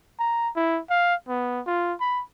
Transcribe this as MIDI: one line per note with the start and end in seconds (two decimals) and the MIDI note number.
0.19 0.50 82
0.56 0.80 64
0.90 1.15 77
1.29 1.61 59
1.66 1.94 65
2.01 2.22 83